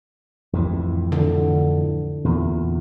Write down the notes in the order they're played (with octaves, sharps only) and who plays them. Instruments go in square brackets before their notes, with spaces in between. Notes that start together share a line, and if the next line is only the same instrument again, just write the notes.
[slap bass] F2 A2 E3
[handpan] D3
[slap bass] E2 A#2